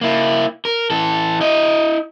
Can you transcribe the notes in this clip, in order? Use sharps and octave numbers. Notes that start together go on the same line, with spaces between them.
A#3 E4
A#4
E3 A4
E4 D#5